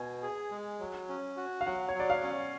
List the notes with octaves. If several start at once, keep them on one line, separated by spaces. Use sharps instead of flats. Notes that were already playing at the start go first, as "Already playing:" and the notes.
Already playing: B2 G#5
G#4
G#3
F#3
C#4
F#4
F5
F#3 F#5
C#5
F#3 D5
F5
C#4